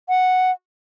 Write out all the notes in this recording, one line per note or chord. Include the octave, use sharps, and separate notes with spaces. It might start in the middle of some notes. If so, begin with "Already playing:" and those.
F#5